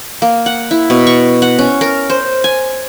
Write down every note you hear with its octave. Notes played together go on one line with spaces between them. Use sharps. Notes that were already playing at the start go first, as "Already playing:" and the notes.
A#3
F#5
E4
B2
C#6
F#5
C#4
A#4
C5
G#5